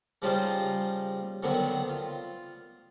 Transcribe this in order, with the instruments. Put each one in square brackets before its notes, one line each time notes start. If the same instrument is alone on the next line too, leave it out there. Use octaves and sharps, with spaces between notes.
[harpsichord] C#3 F3 G3 D#4 F4 C5
D3 D#3 F#3 B3 C4
F4